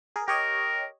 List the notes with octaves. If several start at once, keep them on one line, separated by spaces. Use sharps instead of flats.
G#4 A#4
G4 A#4 C#5 D#5